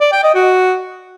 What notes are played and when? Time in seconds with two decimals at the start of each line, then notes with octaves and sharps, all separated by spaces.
0.01 D5
0.12 G5
0.23 D#5
0.35 F#4